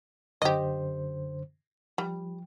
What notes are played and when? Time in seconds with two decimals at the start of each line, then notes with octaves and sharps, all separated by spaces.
0.42 F#2 D3 G4 C5 D#5
1.98 F3 G3